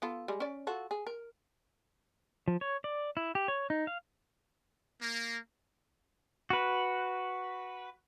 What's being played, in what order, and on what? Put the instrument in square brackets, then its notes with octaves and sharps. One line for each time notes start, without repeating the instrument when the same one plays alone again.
[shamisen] B3 F4 A4
G3 G#3
C#4 D5
F4 F#4 A4
G#4
A#4
[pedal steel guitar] F3
C#5
D5
E4
G4
C#5
D#4
F5
[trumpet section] A#3
[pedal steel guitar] F#4 B4